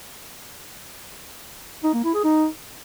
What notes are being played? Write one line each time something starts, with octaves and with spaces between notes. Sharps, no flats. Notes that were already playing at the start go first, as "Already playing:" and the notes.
D#4
A#3
E4
G#4
D#4